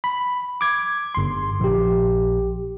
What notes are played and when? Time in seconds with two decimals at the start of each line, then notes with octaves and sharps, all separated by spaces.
0.04 B5
0.61 D6 G#6
1.15 G1 C6
1.60 A#1 G4